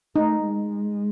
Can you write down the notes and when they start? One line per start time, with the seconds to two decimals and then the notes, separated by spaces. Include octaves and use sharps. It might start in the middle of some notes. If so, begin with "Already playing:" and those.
0.16 A3 D#4
0.45 G#3